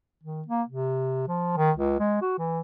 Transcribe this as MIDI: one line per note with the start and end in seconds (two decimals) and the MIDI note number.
0.23 0.42 51
0.47 0.62 58
0.68 1.27 48
1.28 1.56 53
1.57 1.71 51
1.77 1.96 37
1.99 2.18 56
2.22 2.36 66
2.39 2.60 52